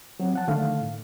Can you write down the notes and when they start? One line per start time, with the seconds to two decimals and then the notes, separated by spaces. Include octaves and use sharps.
0.20 F#3 C4 F#4
0.33 F3 F#5 A5
0.48 D3 D#3 A3 F5
0.81 A2